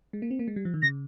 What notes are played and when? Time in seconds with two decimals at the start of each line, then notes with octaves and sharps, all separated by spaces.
0.13 G#3
0.22 A#3
0.31 C4
0.39 A#3
0.48 G#3
0.56 G3
0.65 F3
0.74 D#3
0.82 C#3 A#6